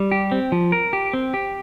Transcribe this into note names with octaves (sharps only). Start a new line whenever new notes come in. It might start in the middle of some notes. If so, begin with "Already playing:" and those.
Already playing: G3
G4
C4
F3
A#4
G4
C4
G4